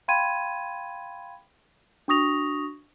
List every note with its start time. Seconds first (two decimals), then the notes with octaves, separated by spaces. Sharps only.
0.08 F5 G5 B5 C6 G#6 D#7
2.08 D4 F#4 C#6 D#6 A#6 F7